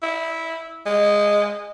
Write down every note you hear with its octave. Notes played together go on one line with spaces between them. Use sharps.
E4
G#3